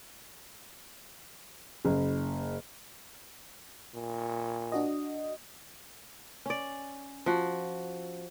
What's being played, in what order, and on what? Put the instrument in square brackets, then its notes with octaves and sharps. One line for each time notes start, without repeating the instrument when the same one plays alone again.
[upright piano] F#1
[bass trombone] A#2
[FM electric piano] D4 F#4 D#5
[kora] C#4 D5
F3 F#4